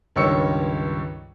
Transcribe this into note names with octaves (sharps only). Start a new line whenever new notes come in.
C#2 G2 D#3 C#5 E6 C#7